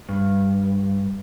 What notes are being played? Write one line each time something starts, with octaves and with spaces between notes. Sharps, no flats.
G2